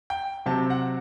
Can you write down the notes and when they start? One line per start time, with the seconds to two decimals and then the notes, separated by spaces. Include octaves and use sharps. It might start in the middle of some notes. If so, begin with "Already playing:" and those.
0.10 G5
0.46 C3 F#3 C4 A5
0.70 F#5